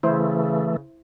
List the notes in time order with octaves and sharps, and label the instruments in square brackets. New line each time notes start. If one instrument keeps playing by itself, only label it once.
[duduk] C#3 [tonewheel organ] E3 A3 [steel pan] E4 C5